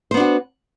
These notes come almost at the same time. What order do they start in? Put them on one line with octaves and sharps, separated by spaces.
C5 B3 D4 F#4